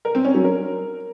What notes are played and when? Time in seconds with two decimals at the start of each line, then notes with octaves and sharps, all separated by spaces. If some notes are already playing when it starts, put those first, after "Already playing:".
0.05 A#4
0.15 C4
0.25 C#4
0.34 F#3
0.44 A#4